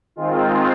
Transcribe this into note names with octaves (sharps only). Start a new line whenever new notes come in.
D#3 G#3 C4 F4